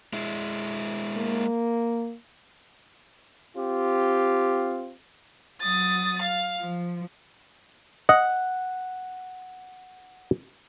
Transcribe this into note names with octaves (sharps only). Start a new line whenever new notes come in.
G#3 E4
A#3
C4 F4 G4
F#3 D#6 A6
F5
F3
D#5 F#5